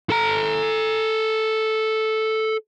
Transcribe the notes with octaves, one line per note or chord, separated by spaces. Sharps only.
A4 A#5